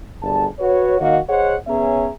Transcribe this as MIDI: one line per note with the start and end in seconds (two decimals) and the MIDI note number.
0.22 0.47 31
0.22 0.47 38
0.22 0.47 55
0.22 0.47 68
0.22 0.47 81
0.59 0.97 66
0.59 0.97 71
0.59 0.97 73
1.00 1.17 51
1.00 1.17 58
1.00 1.17 66
1.00 1.17 75
1.00 1.17 77
1.29 1.55 68
1.29 1.55 72
1.29 1.55 73
1.29 1.55 75
1.29 1.55 78
1.67 2.09 59
1.67 2.09 61
1.67 2.09 68
1.67 2.09 73
1.67 2.09 76
1.67 2.09 82